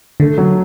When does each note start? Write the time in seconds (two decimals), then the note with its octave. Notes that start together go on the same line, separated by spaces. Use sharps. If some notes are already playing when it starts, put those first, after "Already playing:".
0.20 D3 A3
0.38 F#3